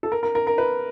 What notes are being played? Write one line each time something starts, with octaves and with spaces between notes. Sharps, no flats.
A4
A#4
A#4
A#4
A#4
B4